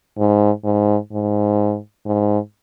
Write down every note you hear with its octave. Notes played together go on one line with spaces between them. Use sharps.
G#2
G#2
G#2
G#2